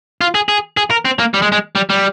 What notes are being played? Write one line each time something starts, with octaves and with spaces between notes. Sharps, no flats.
F4
G#4
G#4
G#4
A#4
C4
A#3
G3
G#3
G#3
G3
G3